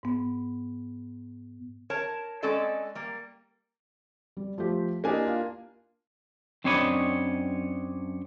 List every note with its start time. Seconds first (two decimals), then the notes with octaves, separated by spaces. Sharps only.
0.03 G#2 B3
1.90 A#4 C#5 A5
2.42 G#3 C4 C#4 A4 D5 D#5
2.95 G3 A#3
4.37 G3
4.58 F3 A3 G4
5.04 A#3 D4 E4 G4 D#5 G#5
5.25 F4 F5
6.64 F#2 C4 D4 C#5 D#5 B5